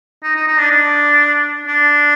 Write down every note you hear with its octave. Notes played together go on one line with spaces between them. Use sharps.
D#4
D#4
D#4
D4
D4
D4